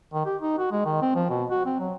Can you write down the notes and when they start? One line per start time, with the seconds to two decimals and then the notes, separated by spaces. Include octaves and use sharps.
0.13 D#3
0.26 G4
0.41 D#4
0.59 F#4
0.71 G#3
0.85 D#3
1.02 C4
1.15 F3
1.30 B2
1.50 F#4
1.66 C4
1.80 F#3